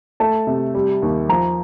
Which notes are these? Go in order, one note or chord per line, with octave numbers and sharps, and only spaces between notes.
A3 A5
C3
G3
D#2
F3 A#5